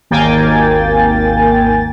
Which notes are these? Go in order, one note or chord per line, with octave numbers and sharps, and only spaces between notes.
G#1 D#2 A#3 G5 G#5 A6